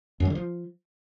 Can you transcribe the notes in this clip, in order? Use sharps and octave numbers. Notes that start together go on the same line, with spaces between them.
F#2
F#3
D3
F3